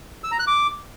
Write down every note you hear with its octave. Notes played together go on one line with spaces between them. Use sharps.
E6
A#5
F#6
D6